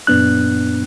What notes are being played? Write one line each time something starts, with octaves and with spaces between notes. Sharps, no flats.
F#2 A#2 B3 D4 F#6